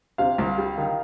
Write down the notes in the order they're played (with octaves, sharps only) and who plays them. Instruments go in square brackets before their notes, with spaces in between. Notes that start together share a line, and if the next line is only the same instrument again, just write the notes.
[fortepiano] C3 [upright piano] F5
[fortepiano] C2
G3
D#3